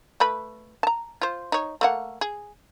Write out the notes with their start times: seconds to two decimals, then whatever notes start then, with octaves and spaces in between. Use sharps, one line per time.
0.20 A3 B4 B5
0.83 A5 A#5
1.21 F4 C5
1.52 D#4 C#5
1.81 A3 A#3 F#5
2.21 G#4